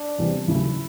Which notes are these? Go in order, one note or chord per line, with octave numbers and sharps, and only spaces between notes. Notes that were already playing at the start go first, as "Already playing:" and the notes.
Already playing: D4
E2 C3 E3 G3 C4
D#2 C#3 F#3 A3 E4